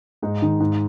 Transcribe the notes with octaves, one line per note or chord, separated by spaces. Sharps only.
G#2 D#4
D#3
G#2